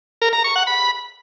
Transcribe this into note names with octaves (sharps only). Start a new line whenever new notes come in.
A#4
A#5
C#6
F#5
B5